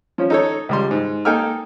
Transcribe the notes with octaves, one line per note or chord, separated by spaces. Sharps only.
F3 C#4
D#4 A4 C#5
C#2 G3 C6
G#2
A#3 D#4 A4 G5 G#5 F6